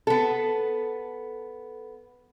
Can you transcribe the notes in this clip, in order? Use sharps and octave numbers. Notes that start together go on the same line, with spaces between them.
B3 A4